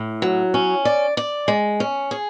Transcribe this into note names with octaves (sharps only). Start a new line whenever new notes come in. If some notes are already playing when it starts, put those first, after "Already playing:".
Already playing: A2
F#3
C#4
D5
D5
G#3
C#4
G#4